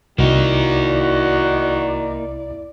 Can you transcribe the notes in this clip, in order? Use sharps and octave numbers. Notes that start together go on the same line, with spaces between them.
C2 A#3 D#4 E4 F#4 D5